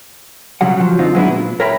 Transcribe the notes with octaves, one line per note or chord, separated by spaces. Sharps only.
B1 C#3 F#3 G3 F#5
F3 F#3
F#2 D3 C4 D4 D#4 F4
F#3 G#3 B3 C4 D4 E4
A#2
A#4 C#5 E5 G5 A#5 B5